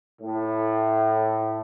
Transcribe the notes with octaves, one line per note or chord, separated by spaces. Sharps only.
A2